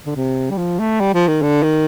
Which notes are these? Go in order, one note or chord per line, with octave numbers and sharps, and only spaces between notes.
D3
C3
G3
F3
A3
G3
F3
D#3
D3
D#3